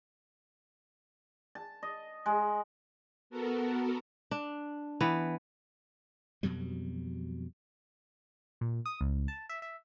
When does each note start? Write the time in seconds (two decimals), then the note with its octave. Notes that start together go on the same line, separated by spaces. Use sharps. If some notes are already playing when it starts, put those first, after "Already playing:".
1.55 A5
1.83 D#5
2.26 G#3
3.30 B3 F#4 A4 A#4
4.31 D4
5.01 E3 B3
6.43 F2 B2 F#3 G3
8.61 A#2
8.86 D#6
9.01 C#2
9.28 A5
9.49 E5
9.62 E5